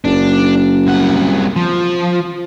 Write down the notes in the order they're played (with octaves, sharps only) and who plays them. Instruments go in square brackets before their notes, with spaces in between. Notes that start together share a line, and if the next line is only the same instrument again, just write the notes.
[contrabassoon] F#1 [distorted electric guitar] D4
[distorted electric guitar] C2 F#5
F3